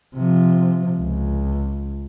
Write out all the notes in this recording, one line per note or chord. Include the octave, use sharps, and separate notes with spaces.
C3 F3
C#2